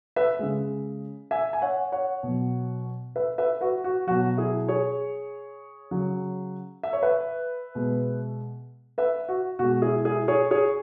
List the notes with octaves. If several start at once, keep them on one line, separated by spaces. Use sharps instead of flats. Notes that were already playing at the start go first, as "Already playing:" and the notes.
B4 E5
C#3 G#3
E5 G#5
G#5
C#5 F#5
C#5 F#5
B2 F#3
B4 E5
B4 E5
F#4 B4
F#4
B2 F#3 F#4
E4 G#4
G#4 C#5
C#3 F#3
E5
C#5
B4 E5
B2 G#3
B4 E5
F#4
B2 G#3 F#4
E4 G#4
E4 G#4
G#4 C#5
G#4 C#5